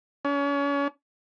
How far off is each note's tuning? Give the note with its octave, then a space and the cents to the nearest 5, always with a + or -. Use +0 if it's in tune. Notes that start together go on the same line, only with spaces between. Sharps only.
C#4 +35